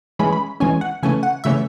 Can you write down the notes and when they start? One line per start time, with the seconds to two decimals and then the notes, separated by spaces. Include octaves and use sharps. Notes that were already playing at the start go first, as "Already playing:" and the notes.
0.19 E3 G#3 C#4 B5
0.33 B5
0.60 E3 G#3 C#4 G#5
0.81 F#5
1.03 C#3 E3 A3 C#4 G#5
1.23 F#5
1.44 C#3 E3 A3 C#4 E5